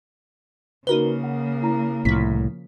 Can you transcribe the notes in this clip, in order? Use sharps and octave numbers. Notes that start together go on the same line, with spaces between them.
C#3 A#3 D#4 F#4 A#4 B4 G7
F#5
E4 A#5
C2 A2 F3 B6